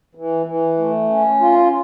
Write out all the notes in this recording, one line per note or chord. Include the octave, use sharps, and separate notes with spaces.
E3
E3
A3
C#4
F4